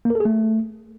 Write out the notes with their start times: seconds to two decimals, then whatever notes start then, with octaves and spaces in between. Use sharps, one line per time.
0.05 A#3
0.10 A#4
0.15 A4
0.20 G#4
0.25 A3